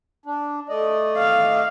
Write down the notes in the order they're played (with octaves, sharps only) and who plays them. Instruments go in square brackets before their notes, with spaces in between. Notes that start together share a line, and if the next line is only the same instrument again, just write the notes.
[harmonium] D4
A3 D5 D#5
[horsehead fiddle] F5